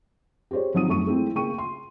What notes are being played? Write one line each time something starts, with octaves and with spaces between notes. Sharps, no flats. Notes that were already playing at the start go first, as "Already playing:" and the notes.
G4 G#4 C5 C#5
G#1 F3 F#3 D#4 D#6 D#7
F#2 A3 C#6 D#7
G#3 A3 C4 E4
C#3 A#3 G5 C#6 D#7
C6